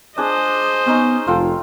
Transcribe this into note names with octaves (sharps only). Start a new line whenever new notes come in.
D4 G#4 C5 D#5
B3 C#4 D#4
F1 F4 A4 G5